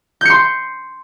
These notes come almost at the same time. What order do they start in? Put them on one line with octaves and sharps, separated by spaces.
G6 C#7 C6